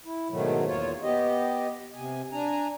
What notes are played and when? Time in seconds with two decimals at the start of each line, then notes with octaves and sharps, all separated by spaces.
0.05 E4
0.30 G#2 B2 D#3 F#3 A3
0.66 E2 A#3 F4 C#5
1.03 B3 G4 D#5
1.95 C3 G#5
2.32 D4 G#5 A#5